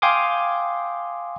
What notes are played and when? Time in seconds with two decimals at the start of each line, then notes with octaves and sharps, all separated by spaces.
0.02 F5 G5 G#5 C6 D6 D#6